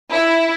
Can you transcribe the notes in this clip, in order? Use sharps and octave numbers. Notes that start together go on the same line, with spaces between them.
E4